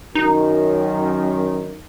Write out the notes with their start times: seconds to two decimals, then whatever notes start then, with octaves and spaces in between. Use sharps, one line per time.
0.15 F#2 D#3 D#4